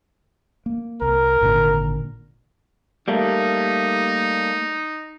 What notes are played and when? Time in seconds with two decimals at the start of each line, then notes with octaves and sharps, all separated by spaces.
0.66 A#3
1.02 C2 A#4
1.41 G#1 A#2 D3
3.08 G3 A3 A#3 D#4